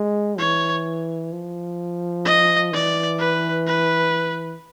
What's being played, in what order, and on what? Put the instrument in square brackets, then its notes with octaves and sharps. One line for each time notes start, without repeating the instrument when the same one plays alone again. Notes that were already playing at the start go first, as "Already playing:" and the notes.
Already playing: [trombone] G#3
[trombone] E3 [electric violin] C#5
[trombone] F3
[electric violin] D#5
[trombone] E3 [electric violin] D5
[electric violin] B4
B4